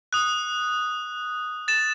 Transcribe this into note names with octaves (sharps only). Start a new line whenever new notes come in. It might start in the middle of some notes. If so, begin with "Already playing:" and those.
D#6 F#6
A6 E7